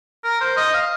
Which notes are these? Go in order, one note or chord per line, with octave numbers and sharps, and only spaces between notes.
A#4
C5
D#5
F5